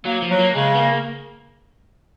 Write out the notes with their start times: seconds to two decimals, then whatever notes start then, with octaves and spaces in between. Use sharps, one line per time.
0.05 F#3 A#3
0.22 F3
0.31 F#3
0.39 A#3
0.54 C#3 G#3
0.74 B3
0.79 A#3